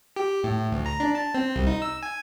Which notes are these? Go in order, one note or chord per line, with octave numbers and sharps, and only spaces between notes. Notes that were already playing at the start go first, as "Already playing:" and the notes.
G4
A2
D2
A#5
D4
A5
C4
C2
D#4
E6
G#5